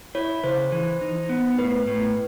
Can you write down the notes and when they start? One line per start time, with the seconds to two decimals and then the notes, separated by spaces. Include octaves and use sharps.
0.15 E4 C#5
0.44 C#3 C5
0.72 E3
1.01 D#4
1.29 B3
1.58 A2 B4
1.87 A2